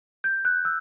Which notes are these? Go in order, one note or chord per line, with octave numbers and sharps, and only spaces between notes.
G6
F#6
E6